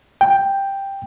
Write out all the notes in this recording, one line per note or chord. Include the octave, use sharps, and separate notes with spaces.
G5